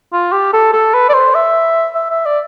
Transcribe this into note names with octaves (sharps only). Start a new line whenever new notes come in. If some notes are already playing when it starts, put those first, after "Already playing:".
F4
G4
A4
A4
B4
D5
C5
E5
E5
E5
D5